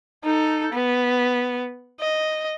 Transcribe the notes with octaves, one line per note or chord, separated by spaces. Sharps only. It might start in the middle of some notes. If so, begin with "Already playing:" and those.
D#4 A4
B3
D#5